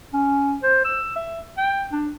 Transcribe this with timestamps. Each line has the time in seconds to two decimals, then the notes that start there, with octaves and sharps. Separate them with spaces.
0.13 C#4
0.63 C5
0.85 E6
1.16 E5
1.58 G5
1.92 D4